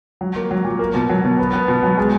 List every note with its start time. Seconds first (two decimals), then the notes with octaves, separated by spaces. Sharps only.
0.21 F#3
0.36 A#3
0.51 F#3
0.64 A#2
0.79 A#3
0.94 B2
1.09 F#3
1.25 B2
1.39 B3
1.53 B3
1.68 B2
1.83 F#3
1.98 G#3